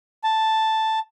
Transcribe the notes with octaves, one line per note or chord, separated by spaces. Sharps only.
A5